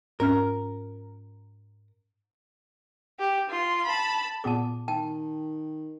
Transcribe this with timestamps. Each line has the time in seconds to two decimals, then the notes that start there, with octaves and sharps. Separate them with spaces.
0.20 G#2 C#4 A#4 F6
3.19 G4
3.50 F4 C6
3.86 A5 B5
4.44 A#2 B3 G#4 A5 D6
4.88 D#3 G5 A5